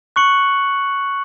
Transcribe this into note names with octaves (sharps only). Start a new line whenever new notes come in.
C#6 F#6 C#7 F#7